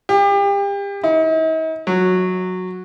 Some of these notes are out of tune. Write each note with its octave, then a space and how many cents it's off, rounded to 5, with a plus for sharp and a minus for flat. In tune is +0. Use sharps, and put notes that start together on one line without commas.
G4 +35
D#4 +45
F#3 -10